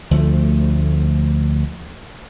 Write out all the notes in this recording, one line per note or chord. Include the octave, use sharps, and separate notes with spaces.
D2 F3 A3